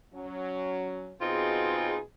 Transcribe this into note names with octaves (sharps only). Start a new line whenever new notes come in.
F#3 C#4
B2 C4 D#4 F4 G#4